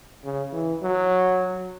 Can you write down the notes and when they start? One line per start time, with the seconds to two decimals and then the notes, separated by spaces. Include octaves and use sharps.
0.24 C#3
0.52 E3
0.82 F#3